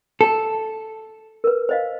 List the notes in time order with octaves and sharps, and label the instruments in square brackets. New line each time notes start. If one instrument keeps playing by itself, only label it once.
[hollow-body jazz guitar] A4
[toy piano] A#4 B4
C5 D#5 F5